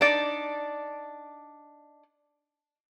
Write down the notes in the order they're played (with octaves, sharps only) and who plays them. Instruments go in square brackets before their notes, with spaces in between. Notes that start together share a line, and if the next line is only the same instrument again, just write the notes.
[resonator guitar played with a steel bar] D4 D#4 D5